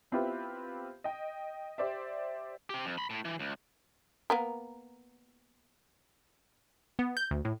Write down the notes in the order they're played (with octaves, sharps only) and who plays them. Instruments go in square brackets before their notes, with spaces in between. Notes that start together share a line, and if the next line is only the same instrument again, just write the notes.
[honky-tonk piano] B3 C4 E4 F4 G4 B4
D#5 G5
G4 C5 D5 E5
[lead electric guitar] C4 G4
F2
B5 C6
A2
E3
C#2
[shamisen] A#3 B3 A#4
[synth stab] B3
G6
D2
A2